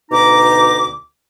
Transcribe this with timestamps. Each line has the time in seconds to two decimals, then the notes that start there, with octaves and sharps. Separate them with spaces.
0.11 D2 B2 D#4 A#5 D6